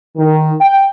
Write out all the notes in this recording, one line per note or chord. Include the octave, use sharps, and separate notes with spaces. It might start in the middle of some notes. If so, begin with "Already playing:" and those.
D#3
G5